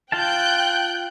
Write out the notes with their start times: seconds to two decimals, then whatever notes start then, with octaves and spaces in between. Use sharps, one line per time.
0.12 F4 F5 G5 A5 F#6 G6